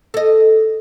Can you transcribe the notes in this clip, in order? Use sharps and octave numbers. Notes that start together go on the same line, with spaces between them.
A4 D#5